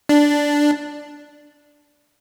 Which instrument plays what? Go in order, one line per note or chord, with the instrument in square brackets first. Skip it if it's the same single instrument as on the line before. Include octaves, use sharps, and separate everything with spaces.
[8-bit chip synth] D4